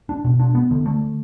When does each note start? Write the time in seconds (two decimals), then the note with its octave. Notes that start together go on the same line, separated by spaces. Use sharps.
0.09 D4
0.25 B2
0.39 D4
0.55 B3
0.71 D3
0.86 A3